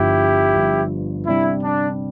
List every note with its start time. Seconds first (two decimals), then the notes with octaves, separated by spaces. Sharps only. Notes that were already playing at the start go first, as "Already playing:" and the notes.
Already playing: G1 G2 F3 E4 G4
0.55 G1 G2 F3
1.27 C3 G3 D4 E4
1.63 D4